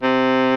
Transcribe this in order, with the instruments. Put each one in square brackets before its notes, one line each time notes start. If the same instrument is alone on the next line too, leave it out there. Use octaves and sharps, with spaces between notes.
[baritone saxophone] C3